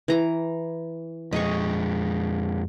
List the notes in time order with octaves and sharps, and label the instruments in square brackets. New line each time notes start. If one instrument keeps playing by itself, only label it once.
[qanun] E3 A#5
[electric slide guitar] F2 G#3 [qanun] D#5 C#6